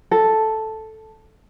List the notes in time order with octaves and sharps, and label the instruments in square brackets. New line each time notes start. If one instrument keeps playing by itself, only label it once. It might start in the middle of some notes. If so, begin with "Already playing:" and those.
[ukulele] A4